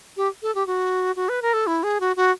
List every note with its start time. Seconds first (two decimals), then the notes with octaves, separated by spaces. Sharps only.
0.17 G4
0.42 A4
0.55 G4
0.67 F#4
1.16 F#4
1.29 B4
1.42 A#4
1.53 A4
1.67 E4
1.83 G#4
2.00 F#4
2.16 F#4